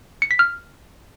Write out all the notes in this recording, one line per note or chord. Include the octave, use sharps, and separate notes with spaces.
C#7
B6
F6